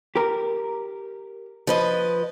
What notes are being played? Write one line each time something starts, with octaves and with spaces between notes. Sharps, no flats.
G4 A#4
F3 B4 D#5